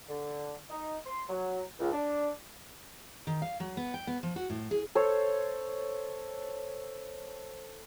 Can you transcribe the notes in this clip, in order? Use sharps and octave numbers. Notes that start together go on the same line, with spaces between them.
D3
D#4
C6
F#3
C#2
D4
D#3
F5
F#3
B3
G5
B3
F3
F#4
A2
G#4
A4 C5 C#5